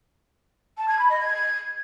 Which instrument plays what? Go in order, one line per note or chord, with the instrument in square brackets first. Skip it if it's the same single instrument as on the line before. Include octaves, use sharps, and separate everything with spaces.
[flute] A5
G#6
B5
D#5
G#6